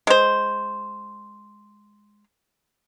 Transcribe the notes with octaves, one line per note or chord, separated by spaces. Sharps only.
G#3 C5